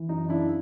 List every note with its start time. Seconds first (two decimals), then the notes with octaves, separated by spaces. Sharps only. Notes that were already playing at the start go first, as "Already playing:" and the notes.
Already playing: E3
0.08 F#2 D#4
0.29 C#3 D4 E4